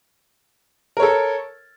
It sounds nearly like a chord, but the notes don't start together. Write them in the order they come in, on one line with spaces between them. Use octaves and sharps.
A#4 C#5 A4